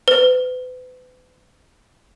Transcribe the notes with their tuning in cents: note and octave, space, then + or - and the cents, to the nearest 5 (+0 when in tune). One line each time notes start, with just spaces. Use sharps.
B4 +40